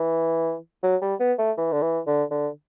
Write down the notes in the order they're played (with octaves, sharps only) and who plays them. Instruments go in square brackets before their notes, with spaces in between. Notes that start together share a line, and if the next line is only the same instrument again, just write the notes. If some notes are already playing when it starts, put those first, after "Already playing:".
Already playing: [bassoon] E3
F#3
G3
B3
A3
E3
D3
E3
D3
D3